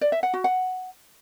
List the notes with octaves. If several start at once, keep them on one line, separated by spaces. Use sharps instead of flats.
D5
E5
F#5
F#4
F#5